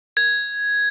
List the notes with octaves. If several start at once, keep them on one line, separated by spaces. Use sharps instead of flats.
G#6